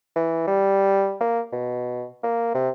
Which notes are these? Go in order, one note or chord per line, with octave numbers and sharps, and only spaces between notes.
E3
G3
A#3
B2
A#3
C3